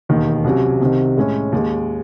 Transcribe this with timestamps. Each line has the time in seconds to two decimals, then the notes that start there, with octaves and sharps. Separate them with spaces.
0.09 E1 D#2 D#3
0.44 C2 C3 F#3 C#4
0.81 C2 C3 D#3
1.17 A2 G#3 C#4
1.52 D#2 D#3 G#3